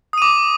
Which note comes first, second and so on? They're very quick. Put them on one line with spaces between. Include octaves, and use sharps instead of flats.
D#6 D#7 D6